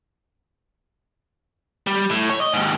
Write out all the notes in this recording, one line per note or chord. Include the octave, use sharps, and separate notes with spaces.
G3
A2
C#5
D#5
D#2 G#2